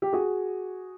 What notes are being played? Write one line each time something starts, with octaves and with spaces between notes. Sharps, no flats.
G4
F#4 G#4